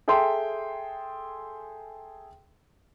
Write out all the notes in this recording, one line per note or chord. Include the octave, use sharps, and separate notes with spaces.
G#4 A4 E5 G5 C6